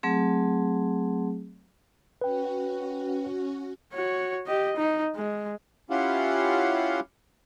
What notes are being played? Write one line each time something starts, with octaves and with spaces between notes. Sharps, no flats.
F#3 A3 C4 G#4
C#4 F#4 B4 G5
F#4 C#5
G4 D#5
D#4
G#3
C#4 E4 F4 G4 F5 F#5